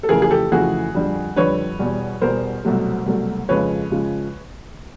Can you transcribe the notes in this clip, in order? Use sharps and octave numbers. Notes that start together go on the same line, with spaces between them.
A4
F2 C#3 E3 A3 G#4 A#4
G#4
G4 A4
F2 C#3 E3 A3 F#4 G#4
F2 D3 G3
F2 D3 G3 B4 C#5
E2 B2 G3
E2 B2 G3 A#4 C5
C2 B2 F#3 A3
C2 B2 F#3 A3
F2 C#3 F3 G#3 B4 C#5
C#3 F3 G#3